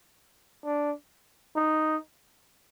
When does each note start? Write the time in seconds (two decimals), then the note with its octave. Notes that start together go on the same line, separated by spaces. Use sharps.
0.65 D4
1.56 D#4